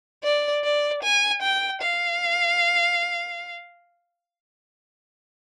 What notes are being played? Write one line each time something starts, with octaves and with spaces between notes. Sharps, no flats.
D5
D5
G#5
G5
F5